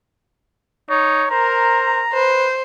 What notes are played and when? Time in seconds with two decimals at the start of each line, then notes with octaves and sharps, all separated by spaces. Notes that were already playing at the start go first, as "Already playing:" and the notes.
0.90 D#4 C#5
1.31 A#4 C5 A#5
2.13 B4 C5